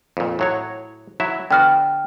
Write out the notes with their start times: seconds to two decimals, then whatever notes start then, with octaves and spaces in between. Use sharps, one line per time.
0.17 F2 A#2
0.39 A2 F#3 C#5
1.20 F#3 E4 E5
1.51 D3 B3 F#4 G5 F6